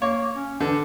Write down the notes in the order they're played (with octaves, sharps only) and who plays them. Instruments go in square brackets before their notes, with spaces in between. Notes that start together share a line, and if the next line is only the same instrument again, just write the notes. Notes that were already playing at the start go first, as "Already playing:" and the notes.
[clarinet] A#3 [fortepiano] C#5
[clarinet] C#4
[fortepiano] D3 [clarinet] E3